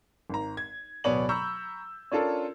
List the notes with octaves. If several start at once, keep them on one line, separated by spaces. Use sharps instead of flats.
G#1 A#5
G#6
D1 B2 B3 C#5 D5 F#7
A#5 B5 C#6 E6 G6
C#4 D4 F4 A4 A#4